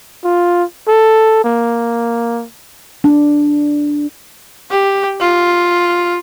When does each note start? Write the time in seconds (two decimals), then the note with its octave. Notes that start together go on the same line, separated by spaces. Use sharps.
0.24 F4
0.88 A4
1.45 A#3
3.04 D4
4.70 G4
5.20 F4